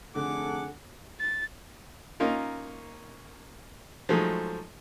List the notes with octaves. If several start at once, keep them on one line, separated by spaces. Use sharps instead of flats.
F1 D3 G#4 A4 F#5 D6
A6
A#3 C#4 D#4 F4 A#4
F3 F#3 G#3 A3 D#4